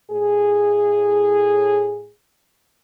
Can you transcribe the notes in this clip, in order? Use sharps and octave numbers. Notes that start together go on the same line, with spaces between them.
A2 G#4